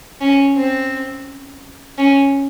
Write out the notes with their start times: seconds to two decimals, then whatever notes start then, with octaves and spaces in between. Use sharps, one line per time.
0.21 C#4
0.56 C4
1.98 C#4